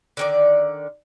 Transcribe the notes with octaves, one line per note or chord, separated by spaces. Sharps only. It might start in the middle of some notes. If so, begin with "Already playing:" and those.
D3 D#3 D5